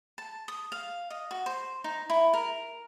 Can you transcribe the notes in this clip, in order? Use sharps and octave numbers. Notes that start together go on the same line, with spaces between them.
A5
D#6
F5
D#5
F#4
C5
D#4
E4
A#4